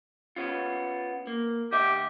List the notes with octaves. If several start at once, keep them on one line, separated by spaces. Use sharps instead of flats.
B3 C#4 F4
A#3
D2 G4 D#5 E5